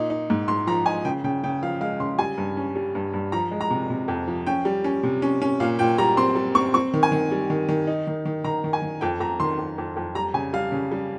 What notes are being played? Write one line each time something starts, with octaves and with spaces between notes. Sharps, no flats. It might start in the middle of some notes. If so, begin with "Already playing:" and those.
Already playing: A#2 D#4
D#4
G#2
G#2 C6
F3 A#5
D#4 G#5
C#3 G5
C#3 G5
C#3 G5
F3 F5
G#3 F5
C#3 C6
G3 G#5
G2
C#4
G3
G2
G2
F3 A#5
G#3
A#5
C3
C3
F2
F3
C#4 G5
G3
C#4
C3
C#4
C#4
A#2 F5
A#2 G5
G3 A#5
C4 C6
G3
C4 C#6
C4 C#6
D#3
G#5
D#3
G3
D#3
D#3
D#4
D#3
D#3
D#3 A#5
D#3
G#5
D#3
F2 G5
F2 A#5
D#3 C6
F2
F2
F2
G3 A#5
C#3 G#5
G3 F5
C#3
G3